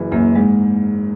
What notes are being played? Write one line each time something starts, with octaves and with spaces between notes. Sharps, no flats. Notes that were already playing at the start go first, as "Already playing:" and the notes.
Already playing: F#1 E3 F#3
F#2 A#3
G#2 G#3